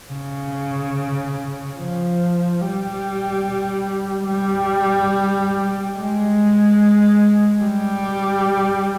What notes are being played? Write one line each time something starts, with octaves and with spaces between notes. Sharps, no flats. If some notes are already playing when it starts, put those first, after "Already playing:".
C#3
F3
G3
G3
G#3
G3